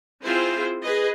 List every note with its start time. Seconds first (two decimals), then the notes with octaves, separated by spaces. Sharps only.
0.25 C4 E4 F4 G#4 C5
0.83 G#4 B4 D#5